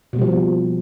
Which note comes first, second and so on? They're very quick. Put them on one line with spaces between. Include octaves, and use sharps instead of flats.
B2 A#3 G3 F3